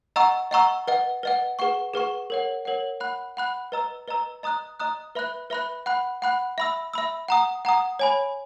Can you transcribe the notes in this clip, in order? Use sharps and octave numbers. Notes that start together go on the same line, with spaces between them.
D#5 F#5 A#5 C#6 E6
D#5 F#5 A#5 C#6 E6
B4 D#5 F#5
B4 D#5 F#5
G#4 B4 F#5 C#6
G#4 B4 F#5 C#6
A#4 C#5 F#5
A#4 C#5 F#5
F#5 B5 F#6
F#5 B5 F#6
B4 D#5 A#5 E6
B4 D#5 A#5 E6
D#5 A#5 D#6 F#6
D#5 A#5 D#6 F#6
B4 E5 B5 F#6
B4 E5 B5 F#6
F#5 B5 F#6
F#5 B5 F#6
E5 B5 E6
E5 B5 E6
F#5 A#5 D#6
F#5 A#5 D#6
C#5 G#5 B5